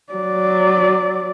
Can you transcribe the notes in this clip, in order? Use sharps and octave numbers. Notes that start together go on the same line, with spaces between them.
F#3 D5